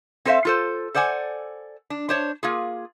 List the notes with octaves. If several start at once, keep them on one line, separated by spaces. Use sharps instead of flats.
C4 A4 C5 C#5 E5 F5
F4 A4 C5
A4 C5 D5 F#5 G#5
D4
D4 C5 C#5
A#3 F4 G#4